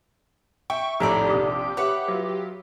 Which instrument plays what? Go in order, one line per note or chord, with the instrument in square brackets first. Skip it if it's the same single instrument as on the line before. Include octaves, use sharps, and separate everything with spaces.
[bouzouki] E5 [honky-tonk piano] G5 [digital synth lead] C#6
[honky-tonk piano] A#1 F2 A2 [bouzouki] D#3 A4 D5 [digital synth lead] G4 [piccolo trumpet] A#5
[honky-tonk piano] A#1 C3 D#6 [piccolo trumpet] D6
[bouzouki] B4 C#5 E5 [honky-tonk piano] F#5
[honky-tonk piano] F#3 F4